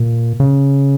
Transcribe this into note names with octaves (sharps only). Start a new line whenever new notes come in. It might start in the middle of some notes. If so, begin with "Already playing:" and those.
Already playing: A#2
C#3